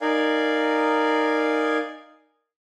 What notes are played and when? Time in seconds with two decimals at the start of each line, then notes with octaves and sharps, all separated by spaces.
0.01 D#4 A#4 D5 F5 G#5